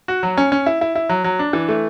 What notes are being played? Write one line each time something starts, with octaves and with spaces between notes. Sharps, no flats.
F#4
F#3
C#4
C#4
E4
E4
E4
F#3
F#3
D4
E3
A3